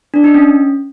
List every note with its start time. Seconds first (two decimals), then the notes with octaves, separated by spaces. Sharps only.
0.14 D4
0.24 D#4
0.34 C#4